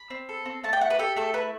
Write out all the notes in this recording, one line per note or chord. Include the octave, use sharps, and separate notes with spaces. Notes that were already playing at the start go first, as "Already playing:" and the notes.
Already playing: B5
C4
A4
C4
A3 A5
G5
E4 F#5
B4
G4 A4
A3 A4
E4 B4